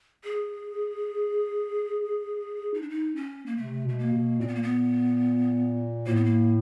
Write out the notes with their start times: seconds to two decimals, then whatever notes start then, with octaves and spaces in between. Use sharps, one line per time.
0.24 G#4
2.74 D#4
2.82 D4
2.89 D#4
3.16 C#4
3.46 A#3
3.57 C3 A3
3.85 B2 A3
3.99 A#3
4.13 B2
4.40 A#2 C4
4.48 B3
4.55 A#3
4.63 B3
6.06 A2 A#3
6.16 B3
6.25 A#3